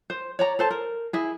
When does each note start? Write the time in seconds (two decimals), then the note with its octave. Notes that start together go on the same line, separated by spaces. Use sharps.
0.10 C5
0.39 C#5 D5 A#5
0.59 A4 C5 A5
0.71 A#4
1.13 E4 G#4